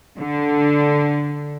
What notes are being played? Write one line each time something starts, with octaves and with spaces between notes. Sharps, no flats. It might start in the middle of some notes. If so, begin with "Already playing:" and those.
D3